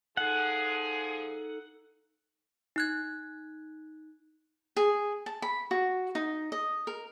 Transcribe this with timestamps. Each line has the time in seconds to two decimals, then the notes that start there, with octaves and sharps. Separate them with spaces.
0.17 F3 D#4 G#4 A4 F#5
2.76 D#4 F#6 G#6
4.76 G#4
5.26 A5
5.42 B5
5.71 F#4
6.15 D#4
6.52 D#5
6.87 A#4